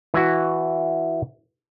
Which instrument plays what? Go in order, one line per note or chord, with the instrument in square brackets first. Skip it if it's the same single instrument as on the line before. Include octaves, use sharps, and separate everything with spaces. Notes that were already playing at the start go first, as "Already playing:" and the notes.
[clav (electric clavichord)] E3 E4 F#4